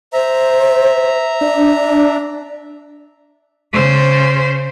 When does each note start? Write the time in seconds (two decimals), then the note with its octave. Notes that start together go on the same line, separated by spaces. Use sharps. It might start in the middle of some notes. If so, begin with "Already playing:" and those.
0.13 C5 E5 A#5
1.41 D4 D5
3.73 C#3 C5